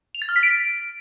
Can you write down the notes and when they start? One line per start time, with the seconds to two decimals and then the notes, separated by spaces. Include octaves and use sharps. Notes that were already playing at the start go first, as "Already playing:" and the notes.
0.15 F7
0.22 A6
0.29 F6
0.36 B6
0.43 D7